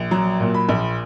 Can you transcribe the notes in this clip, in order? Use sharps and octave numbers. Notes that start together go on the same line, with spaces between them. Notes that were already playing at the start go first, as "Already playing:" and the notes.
Already playing: A#1
F#3 A#5
A#2
B5
A#1